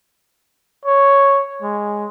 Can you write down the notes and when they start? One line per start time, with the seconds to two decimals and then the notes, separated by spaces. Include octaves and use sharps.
0.85 C#5
1.62 G#3